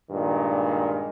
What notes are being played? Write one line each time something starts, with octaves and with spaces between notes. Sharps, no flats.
G2 A#2 D#3 G#3